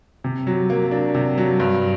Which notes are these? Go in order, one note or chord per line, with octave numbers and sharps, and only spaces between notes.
C3
F#3
A#3
D4
C3
F#3
G2